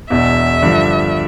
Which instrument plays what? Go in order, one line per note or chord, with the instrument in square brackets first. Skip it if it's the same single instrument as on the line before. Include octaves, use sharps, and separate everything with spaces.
[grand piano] E1 E2 B2 [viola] E5
[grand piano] G2 D3 F3